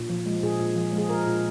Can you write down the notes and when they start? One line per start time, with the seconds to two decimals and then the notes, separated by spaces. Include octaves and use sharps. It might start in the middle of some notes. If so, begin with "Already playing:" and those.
Already playing: A#2
0.09 F3
0.26 G#3
0.43 A#2 G#4
0.60 A#2
0.76 F3
0.93 G#3
0.98 G#4
1.09 A#2 A#4
1.27 A#2